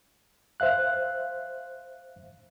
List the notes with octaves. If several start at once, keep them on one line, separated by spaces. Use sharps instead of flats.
C5 E5 F5 F#6